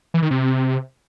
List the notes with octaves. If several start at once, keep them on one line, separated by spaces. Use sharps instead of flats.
E3
D#3
C3